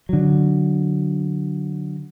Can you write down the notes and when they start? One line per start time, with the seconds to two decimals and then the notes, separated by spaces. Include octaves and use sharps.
0.09 D3 F#3